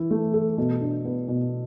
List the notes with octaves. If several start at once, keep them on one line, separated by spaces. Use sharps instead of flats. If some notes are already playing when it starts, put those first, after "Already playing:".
Already playing: E3 E4
A3
A4
B2
D4
B3
B2